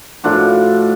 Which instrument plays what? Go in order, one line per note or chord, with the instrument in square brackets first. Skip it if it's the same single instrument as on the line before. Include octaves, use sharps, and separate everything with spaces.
[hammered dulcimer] A2 F3 D4 F#4